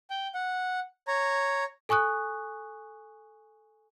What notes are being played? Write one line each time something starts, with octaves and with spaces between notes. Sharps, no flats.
G5
F#5
C#5 A#5
A4 G#5 C#6 D#6 F#6